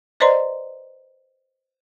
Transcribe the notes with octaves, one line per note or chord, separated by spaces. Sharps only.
B4 C5 D5 D#5 A#5 C6